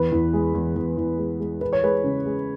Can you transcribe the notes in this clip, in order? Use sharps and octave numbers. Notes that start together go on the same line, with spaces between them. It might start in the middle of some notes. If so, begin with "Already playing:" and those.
Already playing: E2 B4
E2
G#3
E2
E2
E2
G#3
G#3
E3 B4
C#5
G#3 B4
C#3
G#3